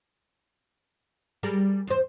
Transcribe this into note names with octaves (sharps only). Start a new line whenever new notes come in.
G3 G#4 A#4
E2 C5